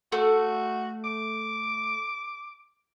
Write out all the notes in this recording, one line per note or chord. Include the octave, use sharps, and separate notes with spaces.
A3 F#4
D6